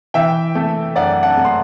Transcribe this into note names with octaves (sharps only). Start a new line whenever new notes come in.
E3 E5 G5
A3
F#2 D5 F#5
F#5 A5
A3
C6